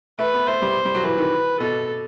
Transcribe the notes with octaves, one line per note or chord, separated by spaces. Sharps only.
A3 B4
B3
A3 C5
G3
G3
F#3
E3 B4
D#3
B2 A4